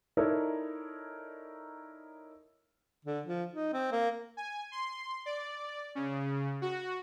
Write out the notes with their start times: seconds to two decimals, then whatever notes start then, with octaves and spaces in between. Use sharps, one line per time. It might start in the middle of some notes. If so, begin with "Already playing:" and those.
0.17 D#4 E4 A4 A#4 C#5 D5
3.05 D3
3.26 F3
3.54 D#4
3.73 C4
3.92 A#3
4.37 G#5
4.72 C6
5.26 D5
5.95 C#3
6.62 F#4